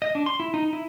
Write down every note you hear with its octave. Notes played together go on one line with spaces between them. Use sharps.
D#5
D4
C6
E4
D#4
E4